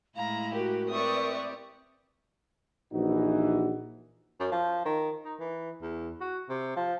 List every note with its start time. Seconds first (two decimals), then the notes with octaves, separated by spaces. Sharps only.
0.17 A2 G#3 E4 F5 A#5
0.54 F#4 G4 A#4
0.89 C4 G4 B4 D5 E5 C#6 D#6
2.92 A#1 E3 D#4 F#4
4.40 F#2
4.52 F3
4.85 D#3
5.25 D#4
5.39 E3
5.82 E2
6.21 F#4
6.49 C3
6.76 F3